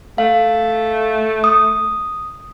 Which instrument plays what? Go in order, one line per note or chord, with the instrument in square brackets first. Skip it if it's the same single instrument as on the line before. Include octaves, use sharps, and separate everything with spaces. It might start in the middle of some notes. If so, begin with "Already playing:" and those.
[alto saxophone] A3 [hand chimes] F5
[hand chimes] D#6